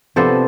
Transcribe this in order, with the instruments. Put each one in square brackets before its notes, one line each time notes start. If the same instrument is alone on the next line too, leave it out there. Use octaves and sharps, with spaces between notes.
[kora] C3 F3 B3 D4 A4 C5